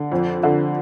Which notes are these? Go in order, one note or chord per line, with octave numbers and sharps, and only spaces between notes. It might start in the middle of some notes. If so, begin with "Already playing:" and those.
Already playing: D3
F2
D3